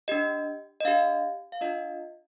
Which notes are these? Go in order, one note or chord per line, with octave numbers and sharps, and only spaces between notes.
D4 G4 D#5
D#5
D4 G4 F5
F5
D4 F4 D#5